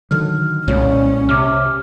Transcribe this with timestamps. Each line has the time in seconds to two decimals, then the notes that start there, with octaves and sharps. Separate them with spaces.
0.11 D3 D#3 F#3 F6
0.68 C2 A#2 G#3 C#4 C#5
1.29 C3 D6 F6